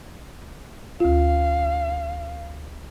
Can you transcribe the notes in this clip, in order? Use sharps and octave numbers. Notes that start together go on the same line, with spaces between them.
D2 F4 F5